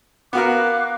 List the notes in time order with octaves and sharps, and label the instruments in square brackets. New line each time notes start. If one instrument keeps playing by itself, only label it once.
[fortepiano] B3 F#4 A#4 [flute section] F5 D6 F#6